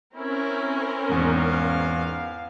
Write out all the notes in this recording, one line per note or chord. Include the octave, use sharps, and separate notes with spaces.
C4 C#4 E4 A#4
E2 G#2 F5